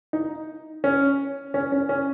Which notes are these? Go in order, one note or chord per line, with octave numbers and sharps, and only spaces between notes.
D#4
C#4
C#4
C#4
C#4